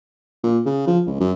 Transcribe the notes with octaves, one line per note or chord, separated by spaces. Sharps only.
A#2
C#3
F3
C#2
F#2